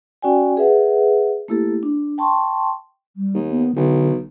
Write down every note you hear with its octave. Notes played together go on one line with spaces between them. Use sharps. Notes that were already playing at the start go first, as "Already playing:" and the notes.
C#4 F#4 D5 G5 G#5
G#4 B4 E5 F#5
A3 A#3 E4 G4 A4
D4
G5 A5 C6 C#6
G3
D#2
B3
B1 D3